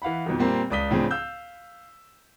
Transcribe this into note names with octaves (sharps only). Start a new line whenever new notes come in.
E3 F5 F#5 B5
F2 B2 D#3
A#2 G3 A#3 C4
C#2 D5 D#6 B6 G7
A2 C#3 F3 C4 D4 G#4
F5 E6 G6